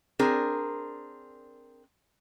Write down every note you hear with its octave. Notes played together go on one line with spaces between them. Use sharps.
C4 D4 G#4 A#4